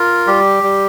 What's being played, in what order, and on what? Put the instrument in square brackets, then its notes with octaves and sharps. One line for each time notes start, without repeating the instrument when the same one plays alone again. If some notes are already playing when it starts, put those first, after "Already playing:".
Already playing: [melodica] F4 A#4
G3 G4
G3